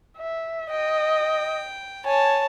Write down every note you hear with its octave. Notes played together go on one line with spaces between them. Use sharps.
E5
D#5 G5
C#5 G#5 A5